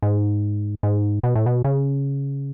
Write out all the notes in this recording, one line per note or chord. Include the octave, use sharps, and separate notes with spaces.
G#2
G#2
B2
A2
B2
C#3